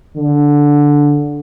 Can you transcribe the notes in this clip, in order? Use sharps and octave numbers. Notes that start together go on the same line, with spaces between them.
D3